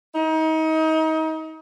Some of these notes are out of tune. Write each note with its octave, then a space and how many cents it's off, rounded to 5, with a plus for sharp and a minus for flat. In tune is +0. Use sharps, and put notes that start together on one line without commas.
D#4 +30